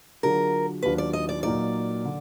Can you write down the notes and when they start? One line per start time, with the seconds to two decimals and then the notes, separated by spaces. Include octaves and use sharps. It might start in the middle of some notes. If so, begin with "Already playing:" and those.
0.23 D3 F#3 D4 F4 G#4 A#4
0.83 D#2 D#3 F#3 D4 F4 B4
0.98 D5
1.13 D#5
1.29 D5
1.43 A#2 F#3 A#3 D#4 D5
2.05 D3